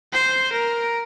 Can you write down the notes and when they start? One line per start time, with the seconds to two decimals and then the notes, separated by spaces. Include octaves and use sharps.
0.13 C5
0.53 A#4